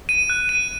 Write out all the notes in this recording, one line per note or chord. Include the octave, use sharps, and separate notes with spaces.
D#7
F#6
D#7